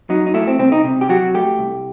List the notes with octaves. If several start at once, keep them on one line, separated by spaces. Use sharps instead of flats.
F#3 D#4
D#4
A3 E4
C4
C2 C4
D#4
C3
G4
F#3 F#4
A3 G4
C2